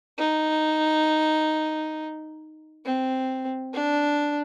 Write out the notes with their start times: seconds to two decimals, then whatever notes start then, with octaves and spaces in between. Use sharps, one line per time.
0.18 D#4
2.85 C4
3.73 D4